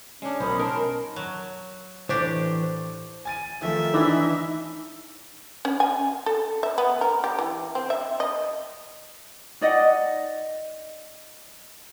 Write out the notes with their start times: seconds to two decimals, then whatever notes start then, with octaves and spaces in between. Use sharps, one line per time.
0.22 G#3 C#4 D4
0.40 B1 A#4 C5 B5 D#6
0.60 D#4 A#4 A5 C6
1.16 F#3
2.09 A2 E3 D4 G4 C5 C#6
3.25 G#5 A6 D#7
3.62 D#3 F3 A3 E5
3.94 E3 D4 D#4 G#5
5.65 C#4
5.80 G#5
6.26 A4
6.63 E5
6.78 B3
7.01 A#4
7.24 G4
7.39 E3
7.75 C4
7.90 E5
8.20 D#5
9.61 D#4 D5 D#5 F#5